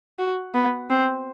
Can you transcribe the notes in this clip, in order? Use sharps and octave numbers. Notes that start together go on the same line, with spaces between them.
F#4
B3
C4